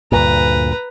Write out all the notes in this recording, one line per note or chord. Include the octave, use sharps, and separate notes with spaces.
D2 G2 A#2 B4 A#5